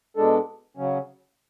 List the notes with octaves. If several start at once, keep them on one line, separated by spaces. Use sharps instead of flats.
B2 G#3 D4 A4
C#3 F#3 C#4